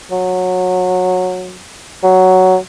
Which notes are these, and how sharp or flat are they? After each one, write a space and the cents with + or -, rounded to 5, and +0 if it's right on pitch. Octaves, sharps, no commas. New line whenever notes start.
F#3 -15
F#3 +5